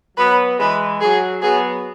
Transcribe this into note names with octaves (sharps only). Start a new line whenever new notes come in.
F#3 B3 B4
E3 G#3 B4
F#3 G#4
F#3 B3 G#4